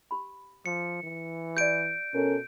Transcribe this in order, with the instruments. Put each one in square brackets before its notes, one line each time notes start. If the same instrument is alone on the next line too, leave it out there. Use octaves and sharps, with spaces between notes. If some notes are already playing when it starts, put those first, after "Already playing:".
[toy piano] G4 B5
[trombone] F3 [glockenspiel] C#7
[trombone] E3
[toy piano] G4 D5 [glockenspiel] G6 D7
[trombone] B2 [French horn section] C#4 A4 A#4